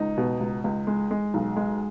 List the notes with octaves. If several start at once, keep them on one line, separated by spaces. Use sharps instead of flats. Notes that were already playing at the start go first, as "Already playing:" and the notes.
Already playing: C#2 D#4
B2
C#2
C#2
G#3
G#3
B1
G#3